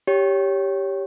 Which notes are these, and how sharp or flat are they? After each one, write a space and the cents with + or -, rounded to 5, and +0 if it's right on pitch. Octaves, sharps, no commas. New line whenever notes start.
G4 +0 C#5 +10